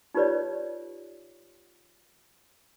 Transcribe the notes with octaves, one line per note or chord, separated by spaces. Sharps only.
D#4 F4 G4 B4 C#5 D5